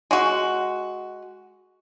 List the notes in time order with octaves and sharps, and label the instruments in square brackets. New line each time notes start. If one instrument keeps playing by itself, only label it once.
[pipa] G#3 F#4